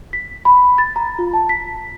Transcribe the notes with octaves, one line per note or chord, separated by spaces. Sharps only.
B6
B5
A6
A#5
F4
A5
B6